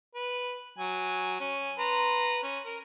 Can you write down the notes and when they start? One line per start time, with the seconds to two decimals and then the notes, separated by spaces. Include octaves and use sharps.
0.15 B4
0.78 F#3 G#5
1.40 C#4
1.78 B4 A#5 C6
2.43 C#4
2.66 A#4